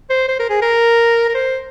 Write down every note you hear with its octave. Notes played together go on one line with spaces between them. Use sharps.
C5
C5
A#4
G#4
A#4
A#4
C5